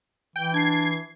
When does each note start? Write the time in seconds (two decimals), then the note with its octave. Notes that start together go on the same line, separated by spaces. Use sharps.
0.36 E3 G5
0.54 D4 G#6 C7